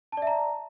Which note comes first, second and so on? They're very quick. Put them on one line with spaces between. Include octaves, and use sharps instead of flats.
A5 D5 E5 A#5